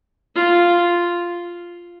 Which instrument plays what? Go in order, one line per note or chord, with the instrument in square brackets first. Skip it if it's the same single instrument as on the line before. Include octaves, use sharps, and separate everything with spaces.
[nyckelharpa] F4